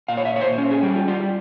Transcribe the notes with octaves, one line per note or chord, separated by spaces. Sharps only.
A#2 F5
C#5
E5
A#2 C#5
C5
C#4
G#4
G3 G4
F4
G3 F4